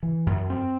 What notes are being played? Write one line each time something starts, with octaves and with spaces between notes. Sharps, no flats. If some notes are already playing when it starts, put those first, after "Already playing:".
E3
F#2
C4